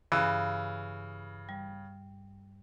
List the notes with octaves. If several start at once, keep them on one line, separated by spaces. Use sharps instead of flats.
G2 C#3 E3
G3